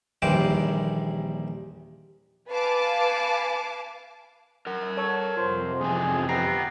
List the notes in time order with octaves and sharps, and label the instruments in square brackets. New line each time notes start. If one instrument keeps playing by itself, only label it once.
[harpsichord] A#1 D#2 E3 G3 C5 D6
[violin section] B4 F5 G#5 A5 D6
[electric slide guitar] A#4 F#5
[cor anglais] A4 [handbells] C#5 C#6 E6
[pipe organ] F2 C3 [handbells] F4 [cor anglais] C5
[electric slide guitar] E2 G#2 G#5 [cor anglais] G#4
[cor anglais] B3 [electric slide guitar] G4 A#5 [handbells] G5 A#6 C7